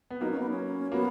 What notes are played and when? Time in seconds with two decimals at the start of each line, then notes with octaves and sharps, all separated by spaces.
0.11 B3
0.21 F#3 A#3 D#4
0.31 C#4
0.40 B3
0.50 C#4
0.92 F#3 A#3 B3